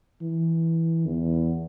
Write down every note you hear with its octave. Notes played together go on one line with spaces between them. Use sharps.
E3
E2